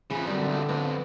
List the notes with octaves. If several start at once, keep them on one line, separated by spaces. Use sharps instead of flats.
F2 C#3 E3 F3
F#2 D3 G3 C4
B1
F2 B3